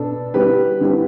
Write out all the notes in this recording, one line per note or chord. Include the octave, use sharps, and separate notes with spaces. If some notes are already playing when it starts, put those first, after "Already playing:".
Already playing: B2 B3 D4 A4
D3 G3 E4 G4 B4
D3 G3 E4 G4 B4